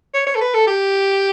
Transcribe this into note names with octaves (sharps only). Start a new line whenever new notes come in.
C#5
C#5
A4
B4
A4
G4